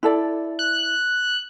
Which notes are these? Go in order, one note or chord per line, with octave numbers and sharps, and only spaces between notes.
E4 A4 D5
F#6